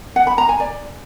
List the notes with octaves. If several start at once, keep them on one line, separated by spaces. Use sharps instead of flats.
F#5
B5
A#5
G#5
D5